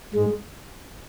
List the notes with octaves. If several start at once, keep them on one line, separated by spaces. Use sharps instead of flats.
G#2 G#3